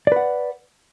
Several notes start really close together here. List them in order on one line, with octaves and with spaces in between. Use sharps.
D5 B4 F#5